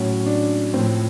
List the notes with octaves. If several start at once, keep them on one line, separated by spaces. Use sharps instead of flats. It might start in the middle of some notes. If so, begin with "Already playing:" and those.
Already playing: A2 F#3 C#4
D4
A2 F3 C4